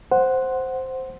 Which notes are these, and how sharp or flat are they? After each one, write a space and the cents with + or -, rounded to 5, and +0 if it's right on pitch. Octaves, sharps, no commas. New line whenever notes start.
C5 +0 F#5 +0